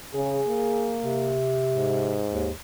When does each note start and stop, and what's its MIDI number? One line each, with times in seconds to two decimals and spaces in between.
0.14 0.41 49
0.14 0.96 68
0.48 1.42 58
1.03 2.24 48
1.75 2.50 44
2.30 2.50 39